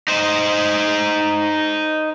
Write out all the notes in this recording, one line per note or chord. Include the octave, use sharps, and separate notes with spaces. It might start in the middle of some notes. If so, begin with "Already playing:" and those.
D#4 C5